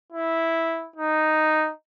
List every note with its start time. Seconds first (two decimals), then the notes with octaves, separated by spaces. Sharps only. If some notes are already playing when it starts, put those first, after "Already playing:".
0.12 E4
0.96 D#4